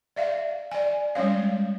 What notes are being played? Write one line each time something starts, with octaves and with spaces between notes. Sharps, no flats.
D5 E5 F5
D5 G#5
G3 G#3 C#4 C#5 F5